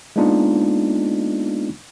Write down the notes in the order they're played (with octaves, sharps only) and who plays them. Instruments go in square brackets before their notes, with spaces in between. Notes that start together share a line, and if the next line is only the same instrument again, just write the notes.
[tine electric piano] G#3 A#3 B3 D4 D#4 F4